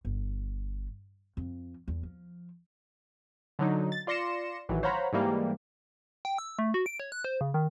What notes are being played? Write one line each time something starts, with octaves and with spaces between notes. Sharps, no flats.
G1
F2
E2
F3
D3 F#3 D#4
A6
F4 D5 C6 A#6 C#7 E7
A1 D#3 E3 F#3
C5 C#5 F5 F#5 A#5 B5
G#2 E3 G3 A#3
G5
E6
A3
F#4
D7
C#5
F#6
C5
C#3
D#3